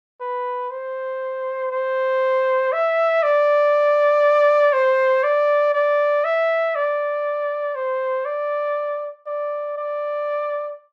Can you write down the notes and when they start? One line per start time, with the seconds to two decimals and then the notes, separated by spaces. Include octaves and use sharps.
0.21 B4
0.70 C5
1.71 C5
2.73 E5
3.23 D5
4.73 C5
5.23 D5
5.74 D5
6.24 E5
6.75 D5
7.75 C5
8.25 D5
9.27 D5
9.77 D5